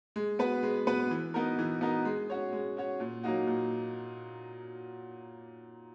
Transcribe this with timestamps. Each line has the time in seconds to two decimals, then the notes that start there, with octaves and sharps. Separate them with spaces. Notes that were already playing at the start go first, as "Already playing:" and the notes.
0.16 G#3
0.39 B3 F#4 B4
0.63 G#3
0.87 B3 F#4 B4
1.11 E3
1.34 B3 D#4 F#4 A#4
1.59 E3
1.81 B3 D#4 F#4 A#4
2.05 G#3
2.30 C#4 F#4 C#5
2.53 G#3
2.77 C#4 F#4 C#5
3.00 A#2
3.23 F#3 A#3 D#4 F#4
3.47 A#2